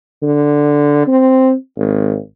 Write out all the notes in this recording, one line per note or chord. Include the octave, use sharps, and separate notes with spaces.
D3
C4
G#1